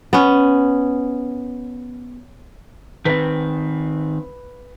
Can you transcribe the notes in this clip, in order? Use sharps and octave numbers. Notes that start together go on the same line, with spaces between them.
B3 C#4
D#3 C4 B4 B6